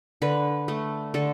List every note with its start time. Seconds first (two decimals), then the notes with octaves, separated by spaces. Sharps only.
0.22 D3 B4
0.68 A3
1.14 D3 A4